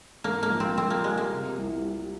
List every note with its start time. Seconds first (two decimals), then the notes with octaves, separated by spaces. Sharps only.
0.24 G#2 A#3
0.43 A#3
0.50 A#1
0.60 C4
0.77 A#1 C4
0.90 A#3
1.04 G3 G#3
1.18 A#3
1.31 C3
1.58 C2
1.83 G3